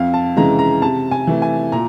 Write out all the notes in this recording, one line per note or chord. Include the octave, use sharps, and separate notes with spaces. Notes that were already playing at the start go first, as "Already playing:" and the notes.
Already playing: F2 F5
A5
C#3 E3 G#3 A#5
A#5
C3 A5
G#5
E3 A3
G#5
A#2 A#5